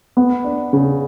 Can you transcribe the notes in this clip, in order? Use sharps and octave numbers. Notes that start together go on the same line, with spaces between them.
B3
D4
C#3